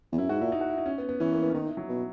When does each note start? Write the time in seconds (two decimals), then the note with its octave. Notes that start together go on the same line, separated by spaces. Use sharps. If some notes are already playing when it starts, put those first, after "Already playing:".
0.12 E2
0.18 F#2 E4
0.29 G#2 F#4
0.41 A#2 E4
0.52 D#4
0.61 F#4
0.70 E4
0.78 D#4
0.86 C#4
0.98 B3
1.09 B3
1.20 E3 C#4
1.32 A#3
1.42 B3
1.50 C#4
1.54 D#3 D#4
1.66 E4
1.77 F#3
1.88 B2